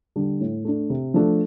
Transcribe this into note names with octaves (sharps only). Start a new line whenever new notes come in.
D3 G3 D4
A2
A3 D4
C3
F3 A3 D4